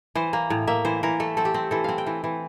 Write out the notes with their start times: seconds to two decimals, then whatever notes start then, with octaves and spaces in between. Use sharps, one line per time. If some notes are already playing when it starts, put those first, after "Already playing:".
0.15 E3 C5
0.33 A#3
0.50 A2
0.67 A#3 E5
0.85 E3 C5
1.03 E3 A#4
1.20 A3 A4
1.37 C4 A4
1.45 G4
1.54 C4
1.71 E3 A4
1.84 C4 F5
1.98 G5
2.07 E3
2.24 E3